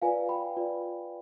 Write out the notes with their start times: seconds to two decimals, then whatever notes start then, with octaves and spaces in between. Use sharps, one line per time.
0.02 F4 B4 D5 F5 G#5
0.29 G5 B5
0.57 F4 B4 D5